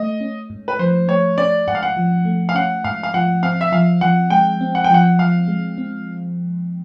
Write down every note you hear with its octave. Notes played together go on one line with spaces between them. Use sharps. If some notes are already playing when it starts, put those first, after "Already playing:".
Already playing: A3 D#5
C#4
G#2
B4
F3 C5
A3 C#5
C#4 D5
G#2 F#5
F5
F#5
F3
A3
F5
C#4 F#5
G#2 F5
F5
F3 F#5
C4 F5
E5
F3 F5
F3 F#5
G#3 G5
C4
F#5
G5
F3 F#5
F3 F5
G#3
C4